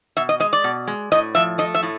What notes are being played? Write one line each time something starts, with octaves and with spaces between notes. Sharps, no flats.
B2 E5
D#5
G#3 D#5
D5
B2
G#3
A2 D#5
F3 E5
A3 D#5
E5
A2